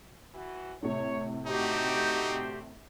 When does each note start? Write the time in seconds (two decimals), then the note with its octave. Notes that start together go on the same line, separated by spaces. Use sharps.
0.35 E3 F#4
0.83 A2 C3 C#5
1.46 D3 A3 C4 D#4 F#4 G4